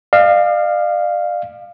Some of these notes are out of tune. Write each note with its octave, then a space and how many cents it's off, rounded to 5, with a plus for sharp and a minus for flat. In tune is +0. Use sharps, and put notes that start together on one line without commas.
D5 +45 F5 +0